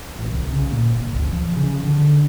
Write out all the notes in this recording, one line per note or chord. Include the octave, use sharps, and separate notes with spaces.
A1
C2
C#3
A#2
G1
C#2
F3
C#3
D3